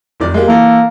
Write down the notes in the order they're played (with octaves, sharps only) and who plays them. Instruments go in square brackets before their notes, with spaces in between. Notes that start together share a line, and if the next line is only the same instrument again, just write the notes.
[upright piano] F1 D#3 D5
G#3 A#3 G4
[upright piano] E3 A4 [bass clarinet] A#3